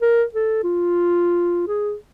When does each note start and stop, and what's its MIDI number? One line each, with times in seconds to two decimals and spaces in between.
0.02 0.24 70
0.34 0.62 69
0.64 1.66 65
1.68 1.94 68